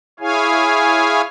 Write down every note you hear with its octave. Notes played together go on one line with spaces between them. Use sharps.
E4 G#4 C#5 F5 G#5